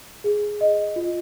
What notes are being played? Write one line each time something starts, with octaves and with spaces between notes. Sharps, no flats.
G#4
D#5
F4